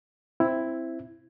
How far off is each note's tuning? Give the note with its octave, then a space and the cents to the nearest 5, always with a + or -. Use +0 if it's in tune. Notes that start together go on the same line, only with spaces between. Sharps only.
C4 +0 E4 +5